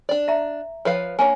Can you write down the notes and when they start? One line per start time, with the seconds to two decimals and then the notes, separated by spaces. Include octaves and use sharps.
0.09 D4 D5
0.28 E5 A#5
0.85 F3 B4 C#5 F5
1.19 A#3 D4 C#5 G#5